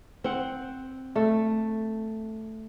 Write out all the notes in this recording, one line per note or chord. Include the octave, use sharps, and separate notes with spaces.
C4 F#5
A3